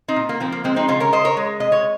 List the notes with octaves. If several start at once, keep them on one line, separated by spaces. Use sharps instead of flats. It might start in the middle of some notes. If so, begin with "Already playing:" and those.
C4 D#4
A#2
A#3
F3 C4
A#3
G#3 C4
C4 D#4
C#3 C#4 F4
A#4 C#5
C#3 C5 D#5
A#4 C#5
G#3
C3 D#5
C#5